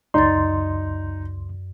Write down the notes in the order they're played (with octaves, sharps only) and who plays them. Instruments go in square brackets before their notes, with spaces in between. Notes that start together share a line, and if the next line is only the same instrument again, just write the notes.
[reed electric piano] C#2 C6 [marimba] F#2 D5 A6 [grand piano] D#4